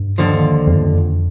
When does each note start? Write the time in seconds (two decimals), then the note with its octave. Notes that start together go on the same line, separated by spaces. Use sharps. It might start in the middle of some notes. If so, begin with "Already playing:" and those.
Already playing: G2
0.18 D#2 D3 F3
0.67 F2
0.75 G2
0.82 F2